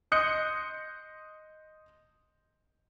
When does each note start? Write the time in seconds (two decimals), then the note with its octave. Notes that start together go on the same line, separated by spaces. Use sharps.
0.12 D#5 C6 D#6 F#6 G6 C#7